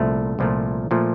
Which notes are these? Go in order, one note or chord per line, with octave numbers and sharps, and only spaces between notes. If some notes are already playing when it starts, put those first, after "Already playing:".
Already playing: C2 A#2 F3 A3
C2 A#2 F3 A3
A#2 F3 A3